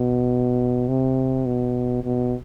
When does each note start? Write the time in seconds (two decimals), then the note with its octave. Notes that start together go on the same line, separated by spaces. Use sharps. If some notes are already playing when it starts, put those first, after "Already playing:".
Already playing: B2
0.88 C3
1.46 B2
2.04 B2